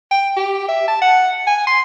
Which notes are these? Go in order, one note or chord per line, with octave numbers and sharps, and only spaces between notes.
G5
G4
E5
A5
F#5
G#5
C6